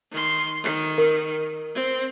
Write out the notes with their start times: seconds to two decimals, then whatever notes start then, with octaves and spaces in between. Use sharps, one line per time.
0.12 D#3 C6
0.63 D#3
0.98 A#4
1.75 C4